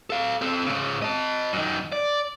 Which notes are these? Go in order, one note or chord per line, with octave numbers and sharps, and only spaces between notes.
A4 F5
C4 A4
G#2 C#3
D#5 A5
F#2 D#3
D5